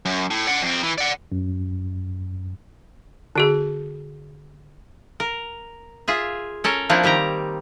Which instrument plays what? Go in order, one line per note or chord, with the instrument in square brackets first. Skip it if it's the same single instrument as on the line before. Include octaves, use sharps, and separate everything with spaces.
[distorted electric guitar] F#2
A2
D5 F#5
F2 C4
E3
D5 F#5
[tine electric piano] F#2
[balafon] D3 F#4 G#4
[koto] A#4
F4 G#4 E5
C#4 A4 A#4 C#5
F3 A#3 C4 D4 E4
D#3 G3 G4 A#5